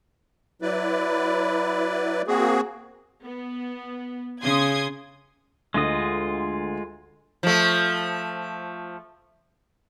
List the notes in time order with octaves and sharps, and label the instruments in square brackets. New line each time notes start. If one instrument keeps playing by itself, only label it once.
[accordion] F#3 E4 B4 D5
A#3 C4 F#4 G#4
[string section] B3
[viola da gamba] C#3 [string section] C6 D#6 G#6
[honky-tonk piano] D2 [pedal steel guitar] G#3 F4 D#5
[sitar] F3 A3